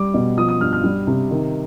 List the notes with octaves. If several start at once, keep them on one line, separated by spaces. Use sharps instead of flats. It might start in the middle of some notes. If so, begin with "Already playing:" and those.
Already playing: G3 D6
B2
F3 D#6
D#6
G2 F6
F6
G3
C3
D#3